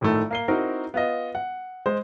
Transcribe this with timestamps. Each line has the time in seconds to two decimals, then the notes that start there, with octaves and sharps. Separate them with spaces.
0.01 A#1 A2 D#3 A3
0.31 A#3 C7 G7
0.48 C4 D#4 E4 F#4 A#4
0.94 B3 F4 D#5
1.35 F#5
1.86 G#3 C5